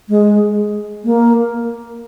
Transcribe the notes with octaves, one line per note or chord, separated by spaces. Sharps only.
G#3
A#3